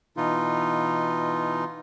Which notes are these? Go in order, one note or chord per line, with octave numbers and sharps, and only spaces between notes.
B2 E3 D#4 F4